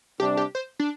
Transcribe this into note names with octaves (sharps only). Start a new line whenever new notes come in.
C3 G3 D4 G4
G4
C5
D4